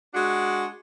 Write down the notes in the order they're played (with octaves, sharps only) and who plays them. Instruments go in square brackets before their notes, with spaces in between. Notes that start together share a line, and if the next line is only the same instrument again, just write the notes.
[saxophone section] G#3 D4 F#4